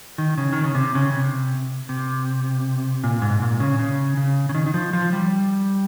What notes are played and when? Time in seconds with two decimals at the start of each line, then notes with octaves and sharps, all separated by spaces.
0.18 D#3
0.38 C#3
0.53 D#3
0.64 C#3
0.75 C3
0.95 C#3
1.13 C3
1.89 C3
3.04 A#2
3.22 G#2
3.42 A#2
3.60 C#3
3.79 C#3
4.17 C#3
4.49 C#3
4.55 D#3
4.66 D#3
4.74 F3
4.93 F3
5.13 G3